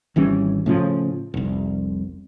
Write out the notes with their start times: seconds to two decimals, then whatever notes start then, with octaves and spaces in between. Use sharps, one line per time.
0.16 G#1 E3 G3 C#4
0.66 A2 C#3 F3
1.34 F1 C2